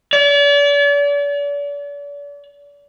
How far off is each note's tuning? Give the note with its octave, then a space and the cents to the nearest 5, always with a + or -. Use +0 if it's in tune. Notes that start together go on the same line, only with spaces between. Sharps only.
D5 -40